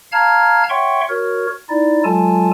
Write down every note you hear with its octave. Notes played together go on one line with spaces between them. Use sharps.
F5 A5 A#5 F6 G#6
C#5 E5 F#5 G5 C6 C#6
F#4 A#4 C#5
D#4 E4 D5
F#3 G#3 F4 A4 G#5 A5